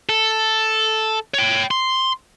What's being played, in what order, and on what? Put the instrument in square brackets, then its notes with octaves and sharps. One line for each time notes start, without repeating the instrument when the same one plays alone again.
[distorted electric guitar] A4
C#5 G5
C6